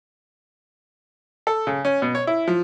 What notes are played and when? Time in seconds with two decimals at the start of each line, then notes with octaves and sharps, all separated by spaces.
1.47 A4
1.67 C#3
1.85 C#4
2.02 B2
2.15 C#5
2.27 E4
2.48 F3